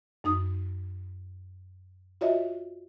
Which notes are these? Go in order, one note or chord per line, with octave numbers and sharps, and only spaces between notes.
F#2 D#4 D#6
F4 F#4 C#5 D#5 E5